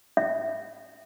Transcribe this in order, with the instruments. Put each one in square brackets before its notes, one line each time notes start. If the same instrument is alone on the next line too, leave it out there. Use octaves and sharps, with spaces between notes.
[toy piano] E5